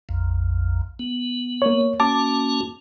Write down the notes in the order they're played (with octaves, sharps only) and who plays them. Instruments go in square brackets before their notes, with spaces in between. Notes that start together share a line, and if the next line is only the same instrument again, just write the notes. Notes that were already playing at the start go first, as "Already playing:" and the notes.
[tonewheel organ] A#1 F2
B3
[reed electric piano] A#3 C#5
[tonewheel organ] A#3 C#4 F#4 [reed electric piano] A5 D6